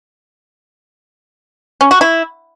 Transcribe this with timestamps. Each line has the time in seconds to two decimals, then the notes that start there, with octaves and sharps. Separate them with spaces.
1.81 C#4
1.91 F#4
2.01 E4